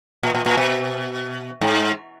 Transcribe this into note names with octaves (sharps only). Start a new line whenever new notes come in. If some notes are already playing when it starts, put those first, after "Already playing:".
A#2
A#2
A#2
B2
G#2